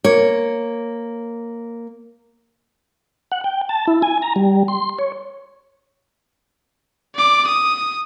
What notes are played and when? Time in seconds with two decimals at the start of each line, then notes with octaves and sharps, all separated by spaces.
0.04 A#3 C#5
3.32 F#5
3.44 G5
3.69 A5
3.87 E4
4.02 G#5
4.22 A#5
4.36 G3
4.68 C6
4.99 C#5
7.15 D5 D6
7.47 D#6